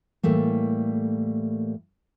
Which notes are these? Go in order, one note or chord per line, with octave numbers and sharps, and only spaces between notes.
A2 E3 G3 A3 A#3